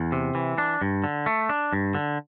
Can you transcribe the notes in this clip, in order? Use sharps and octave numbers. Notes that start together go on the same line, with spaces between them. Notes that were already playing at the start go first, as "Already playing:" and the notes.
Already playing: E2
C3
E3
D4
G2
D3
A3
D4
G2
D3